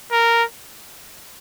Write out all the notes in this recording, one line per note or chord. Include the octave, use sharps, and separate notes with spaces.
A#4